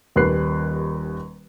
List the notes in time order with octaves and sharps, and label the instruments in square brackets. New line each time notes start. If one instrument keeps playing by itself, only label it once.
[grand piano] D#1 D#2 B4 F#6 C7